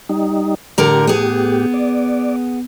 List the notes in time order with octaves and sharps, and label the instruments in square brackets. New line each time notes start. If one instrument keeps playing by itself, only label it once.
[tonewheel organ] G3 D#4
[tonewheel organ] A2 G4 [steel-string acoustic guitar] D3 A#4 A#5
[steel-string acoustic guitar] B3 G#4
[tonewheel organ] D5